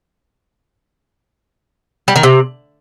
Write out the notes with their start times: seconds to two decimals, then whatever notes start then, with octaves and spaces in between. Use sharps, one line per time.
2.08 G3
2.16 D#3
2.23 C3